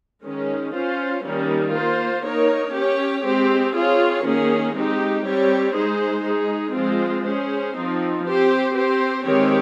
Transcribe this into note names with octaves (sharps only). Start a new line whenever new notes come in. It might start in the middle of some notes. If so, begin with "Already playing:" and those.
D#3 G#3 C#4
C#4 F4 C5
D#3 G3 A#3 C#4
A#3 F4 C5
A#3 D#4 A#4 C#5
C#4 G4 C#5
G#3 C4 G4 C5
C4 F4 G#4 C#5
D#3 A#3 C#4 G#4
G#3 C4 D#4 G4
G3 C4 G4 C#5
G#3 D#4 G#4 C5
G#3 D#4 G#4
F3 G#3 C4 F4 C5
C#4 G#4 C5
F3 C4 D#4
C4 G4 C5
C4 G4 C5
D#3 G#3 C4 G4 C#5